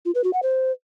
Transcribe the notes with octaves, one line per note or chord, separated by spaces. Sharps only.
F4
B4
F#4
F#5
C5